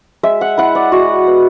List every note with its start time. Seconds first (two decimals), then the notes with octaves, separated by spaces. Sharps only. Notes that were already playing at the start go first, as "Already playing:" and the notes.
0.23 G#3 E5
0.41 F#5
0.58 E4 F#5
0.75 D5
0.92 G#3 F#4
1.27 B3